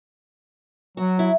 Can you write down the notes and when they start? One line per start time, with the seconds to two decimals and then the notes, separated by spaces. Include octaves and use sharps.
0.97 F#3 F#4
1.19 E4